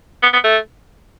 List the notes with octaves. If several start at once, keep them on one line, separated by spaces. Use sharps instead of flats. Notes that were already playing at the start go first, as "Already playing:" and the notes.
B3
B3
A3